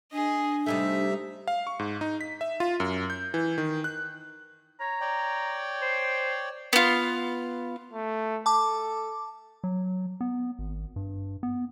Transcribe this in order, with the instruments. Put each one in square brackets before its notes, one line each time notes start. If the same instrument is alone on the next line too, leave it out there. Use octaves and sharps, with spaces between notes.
[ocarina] D4 [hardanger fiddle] G#4 D#5
[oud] C3 G3 A3 [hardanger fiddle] D#4 [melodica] E5
[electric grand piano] F5
C#6
G#2
D#4
B6
E5
F4
F#2
G6
E3
D#3
F#6
[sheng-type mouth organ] C#5 [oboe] A#5
[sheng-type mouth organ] C#5 D5 G5
[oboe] C5
[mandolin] B3 F4
[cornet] A3
[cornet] A4 [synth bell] A5 D6
[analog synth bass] F#3
B3
G#1
G2
B3